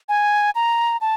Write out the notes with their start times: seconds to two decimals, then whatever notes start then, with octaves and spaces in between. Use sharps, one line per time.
0.09 G#5
0.55 A#5
1.01 A5